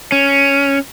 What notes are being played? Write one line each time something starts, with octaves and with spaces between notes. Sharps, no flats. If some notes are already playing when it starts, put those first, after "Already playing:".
C#4